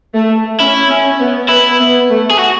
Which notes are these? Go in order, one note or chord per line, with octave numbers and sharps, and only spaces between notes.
A3
C#4 E4
C#4
B3
B3 E4
B3
A3
G#4
F#4